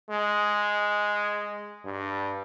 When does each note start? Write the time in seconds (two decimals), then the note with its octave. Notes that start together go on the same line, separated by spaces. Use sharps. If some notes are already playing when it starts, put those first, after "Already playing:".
0.10 G#3
1.85 G2